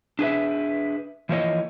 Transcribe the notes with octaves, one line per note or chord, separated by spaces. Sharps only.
D4 G#4 B4 E5
E3 F3 A#3 C#5 D#5